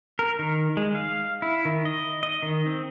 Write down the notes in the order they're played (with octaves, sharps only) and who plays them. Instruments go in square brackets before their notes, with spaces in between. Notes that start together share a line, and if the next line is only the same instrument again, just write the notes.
[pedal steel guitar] A#4
D#3
G#3
F5
E4
D#3
D#5
D#5
D#3
C4